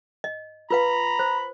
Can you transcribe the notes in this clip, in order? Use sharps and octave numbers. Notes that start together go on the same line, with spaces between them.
D#5
F4 B4 F5 A#5 B5
C5